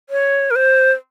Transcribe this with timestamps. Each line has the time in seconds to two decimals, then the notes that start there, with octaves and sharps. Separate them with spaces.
0.10 C#5
0.51 A#4
0.56 C5